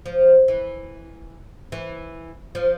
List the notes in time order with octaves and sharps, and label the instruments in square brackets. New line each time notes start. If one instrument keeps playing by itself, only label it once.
[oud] F3
E3
E3
F3